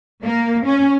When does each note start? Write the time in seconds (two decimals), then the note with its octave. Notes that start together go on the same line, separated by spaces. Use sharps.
0.24 A#3
0.66 C#4